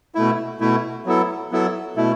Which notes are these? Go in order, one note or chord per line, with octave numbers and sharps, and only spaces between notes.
B2 A3 E4
B2 A3 E4
F#3 B3 E4 A4
F#3 B3 E4 A4
B2 A3 E4